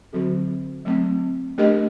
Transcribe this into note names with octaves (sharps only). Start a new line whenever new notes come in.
D3 F#3 C4 F#4 A4
F#3 A3 C4
A3 D4 G4 A#4 D#5